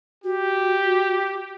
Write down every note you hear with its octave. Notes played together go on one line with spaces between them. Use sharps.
F#4 G4